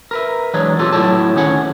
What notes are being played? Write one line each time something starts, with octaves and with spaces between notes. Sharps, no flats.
A#4 B4 E5
E3 F#3 G#3 D4 C#5
B1 F4 G4 A4
A2 F#3 C#5 A5
D2 D#3 C#4 G#4 C#5 F#5